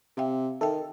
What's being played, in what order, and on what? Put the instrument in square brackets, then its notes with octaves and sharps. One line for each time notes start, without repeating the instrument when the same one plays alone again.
[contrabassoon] C3 [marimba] E5 F5 G5
[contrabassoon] D#3 [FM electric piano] A4 [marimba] E5 G5